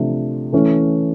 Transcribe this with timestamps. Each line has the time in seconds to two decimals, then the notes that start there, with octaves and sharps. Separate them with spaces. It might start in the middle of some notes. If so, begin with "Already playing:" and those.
Already playing: C3 F3 A3 D4
0.52 E3 A3 C#4